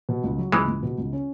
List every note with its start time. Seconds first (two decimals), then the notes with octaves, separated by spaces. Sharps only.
0.09 B2
0.24 C#2
0.38 F#3
0.52 C#2 E3 G#3
0.68 C#2
0.83 B2
0.98 C#2
1.13 C#4